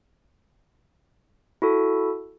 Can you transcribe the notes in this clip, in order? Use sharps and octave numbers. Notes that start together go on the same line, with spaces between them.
E4 F#4 A4